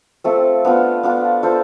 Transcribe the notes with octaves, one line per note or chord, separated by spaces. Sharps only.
A3 C4 F4
B3 D4 F4
B3 D4 F4
D4 F4 A4 C5